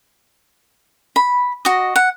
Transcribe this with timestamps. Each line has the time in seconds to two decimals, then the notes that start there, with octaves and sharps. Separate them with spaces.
1.16 B5
1.65 F#4 D#5
1.96 F#5